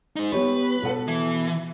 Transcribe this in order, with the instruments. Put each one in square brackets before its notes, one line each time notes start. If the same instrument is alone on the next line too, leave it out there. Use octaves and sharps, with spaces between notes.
[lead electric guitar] G#3 D#4
[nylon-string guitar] B3 G4 C#5 [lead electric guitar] B4
[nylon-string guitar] B2 A4 F#5
[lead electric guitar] E3